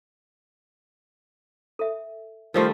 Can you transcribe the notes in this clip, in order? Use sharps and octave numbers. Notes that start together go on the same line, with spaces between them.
A4 E5
D#3 F3 G3 A3 A#4 C5 E6